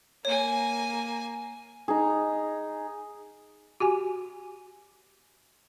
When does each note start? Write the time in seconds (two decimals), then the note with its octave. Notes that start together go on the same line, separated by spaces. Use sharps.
0.25 A#3 C#5 G#5
1.88 D#4 G#4
3.80 F#4 G4 G#5